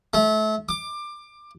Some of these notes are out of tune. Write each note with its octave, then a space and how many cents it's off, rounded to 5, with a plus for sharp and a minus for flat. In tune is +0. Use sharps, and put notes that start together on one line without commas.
A3 -30
D6 +20